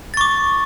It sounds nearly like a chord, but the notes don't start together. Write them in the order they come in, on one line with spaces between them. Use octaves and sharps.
A6 C#6 D6